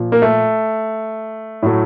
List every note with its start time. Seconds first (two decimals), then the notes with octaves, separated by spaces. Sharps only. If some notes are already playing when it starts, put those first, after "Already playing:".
Already playing: A#2 F3
0.12 A#3
0.22 A3
1.63 A2 F#3 A3